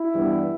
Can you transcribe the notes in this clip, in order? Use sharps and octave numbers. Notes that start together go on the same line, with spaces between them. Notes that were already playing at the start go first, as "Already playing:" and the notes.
Already playing: E4
G2 E3 G3 B3